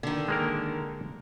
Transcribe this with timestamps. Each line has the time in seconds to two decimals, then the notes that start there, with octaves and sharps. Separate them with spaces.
0.03 D3 D#3
0.29 G#3 A#3 A#4